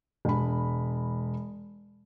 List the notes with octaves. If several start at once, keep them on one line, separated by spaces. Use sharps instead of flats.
E1 B5